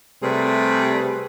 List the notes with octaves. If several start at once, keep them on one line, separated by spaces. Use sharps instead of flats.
C3 G3 A3 G#4 B4